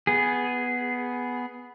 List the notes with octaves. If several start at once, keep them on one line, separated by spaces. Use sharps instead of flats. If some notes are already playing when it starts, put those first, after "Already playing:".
B3 G#4